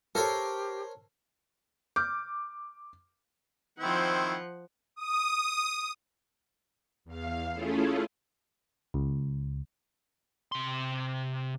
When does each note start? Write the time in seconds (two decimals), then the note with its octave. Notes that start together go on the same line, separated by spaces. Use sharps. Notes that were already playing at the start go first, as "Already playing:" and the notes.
0.15 G4 A4 A#4 C5 C#5
1.96 D6 F6 G6
3.80 D#3 F3 C4 E4 F#5
4.96 D#6
7.05 E2 F5
7.53 A3 C#4 E4 F4 G#4 A4
8.94 C#2
10.52 C3 C6